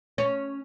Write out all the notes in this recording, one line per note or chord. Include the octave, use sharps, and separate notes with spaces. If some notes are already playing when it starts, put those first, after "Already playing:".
C#4